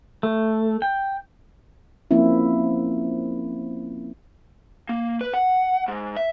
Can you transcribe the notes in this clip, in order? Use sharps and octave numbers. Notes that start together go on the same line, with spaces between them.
A3
G5
F3 A#3 C4 C#4 E4
A#3
B4
F#5
G#2
E5